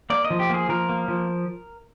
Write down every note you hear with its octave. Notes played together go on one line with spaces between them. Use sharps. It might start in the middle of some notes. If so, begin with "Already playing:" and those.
A#3 D5
D#5
F3
G4
A#3 G#4
F3 A#4
A#3
F3